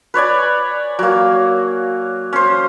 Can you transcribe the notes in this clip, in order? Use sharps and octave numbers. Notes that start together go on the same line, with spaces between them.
B4 C#5 D5 G#5
F#3 A#3
C#4 C5